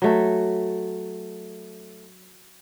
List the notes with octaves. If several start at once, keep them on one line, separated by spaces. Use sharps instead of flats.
F#3 A3